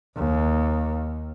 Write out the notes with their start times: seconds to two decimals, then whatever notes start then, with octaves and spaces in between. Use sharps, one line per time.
0.16 D#2